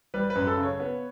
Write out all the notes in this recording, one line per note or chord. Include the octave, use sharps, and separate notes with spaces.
G3 B4
B4
F#2
A4
C#3
C#5
B3